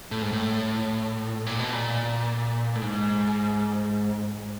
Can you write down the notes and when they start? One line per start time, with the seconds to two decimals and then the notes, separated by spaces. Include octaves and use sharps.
0.11 A2
0.22 G#2
0.32 A2
1.46 A#2
1.59 B2
1.73 A#2
2.75 A2
2.81 G#2